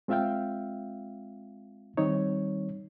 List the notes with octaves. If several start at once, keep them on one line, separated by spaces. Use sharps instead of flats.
G#3 C4 F4 E5 F5 G5
D#3 G3 C4 D#4 C#5